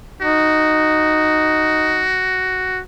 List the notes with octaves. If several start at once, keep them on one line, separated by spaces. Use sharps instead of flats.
D#4 F#4